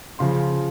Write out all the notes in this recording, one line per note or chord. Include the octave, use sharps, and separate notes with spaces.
C#3 F3 C6